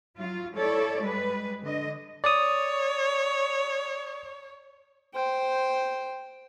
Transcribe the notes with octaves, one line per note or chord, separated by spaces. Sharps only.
F#3 F4
E4 A4 C#5 D5
G3 G#3 B4
D3 D#5
C#5 D5 D#6
C5 G5